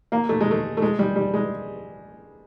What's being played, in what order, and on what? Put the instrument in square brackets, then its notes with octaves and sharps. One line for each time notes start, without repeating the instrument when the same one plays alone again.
[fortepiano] A#3
A3
G#3
A3
A3
G#3
G3
G3
G#3